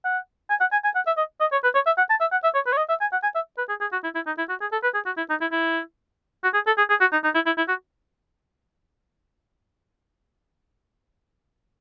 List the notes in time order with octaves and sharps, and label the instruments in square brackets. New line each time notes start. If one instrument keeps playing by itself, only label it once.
[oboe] F#5
G#5
F#5
G#5
G#5
F#5
E5
D#5
D#5
C#5
B4
C#5
E5
F#5
A5
E5
F#5
E5
C#5
B4
C#5
D#5
E5
G#5
F#5
G#5
E5
B4
G#4
G#4
F#4
E4
E4
D#4
E4
F#4
G#4
A4
B4
G#4
F#4
E4
D#4
E4
E4
F#4
G#4
A4
G#4
G#4
F#4
D#4
D#4
E4
E4
E4
F#4